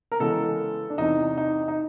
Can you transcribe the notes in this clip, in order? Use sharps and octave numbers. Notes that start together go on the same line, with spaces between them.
A#4
C#3 E3 G#3 B3 A4
D4
E2 C3 E3 D#4
D#4
D#4